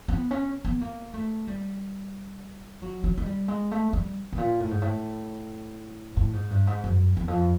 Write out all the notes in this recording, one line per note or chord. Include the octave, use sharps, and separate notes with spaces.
C4
B3
C#4
B3
A#3
A3
G3
F#3
F#3
G#3
G3
G#3
A3
G3
A2
A#2
A2
G#2
A2
A2
G#2
G2
G#2
F#2
E2
F2